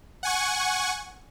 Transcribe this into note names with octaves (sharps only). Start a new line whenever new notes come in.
F#5 G#5 C#6